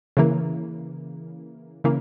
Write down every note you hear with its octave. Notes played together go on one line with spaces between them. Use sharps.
C#3 E3 A#3
C#3 E3 A#3